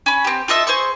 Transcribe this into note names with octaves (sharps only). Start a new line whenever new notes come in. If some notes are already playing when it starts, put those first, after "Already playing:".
C#4 B5
C4 G4
F4 A4 D#5 E5
G#4 C5 C6 C#6